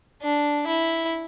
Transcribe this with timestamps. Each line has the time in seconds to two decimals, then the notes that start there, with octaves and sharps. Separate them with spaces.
0.22 D4
0.67 E4